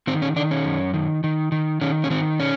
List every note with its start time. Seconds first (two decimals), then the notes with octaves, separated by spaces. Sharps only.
0.07 D#3 C4
0.22 C#4
0.36 D#3 D4
0.51 C#4
0.65 F#2
0.94 D#3
1.24 D#3
1.52 D#3
1.81 D#3 C#4
2.04 C#4
2.10 D#3 C4
2.40 C#4